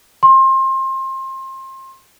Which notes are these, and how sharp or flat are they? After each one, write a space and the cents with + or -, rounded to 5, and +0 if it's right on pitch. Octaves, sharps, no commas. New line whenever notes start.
C6 +30